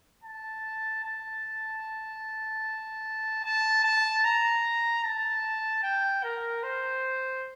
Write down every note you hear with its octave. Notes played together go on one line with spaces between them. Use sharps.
A5
A5
A5
A5
A#5
A5
G5
A#4
C5